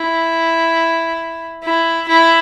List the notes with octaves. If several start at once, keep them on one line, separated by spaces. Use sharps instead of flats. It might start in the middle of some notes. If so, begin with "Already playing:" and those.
Already playing: E4
E4
E4